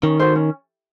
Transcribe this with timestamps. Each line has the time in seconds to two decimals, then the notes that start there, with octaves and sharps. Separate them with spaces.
0.03 D#3 C#4
0.19 F#4 A4 C5
0.35 C#4